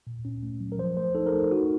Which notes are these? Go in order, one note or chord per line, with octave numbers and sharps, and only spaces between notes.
A#2
C#4
A3
F#3
A#4
F3 C5
A3 C5
D#4 A4
A#4
A3 A4
D#4 F#4